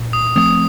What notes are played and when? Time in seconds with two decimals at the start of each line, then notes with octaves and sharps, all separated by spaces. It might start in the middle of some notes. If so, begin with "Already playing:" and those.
Already playing: A#2
0.13 D#6
0.36 F3 A3 C4 D#6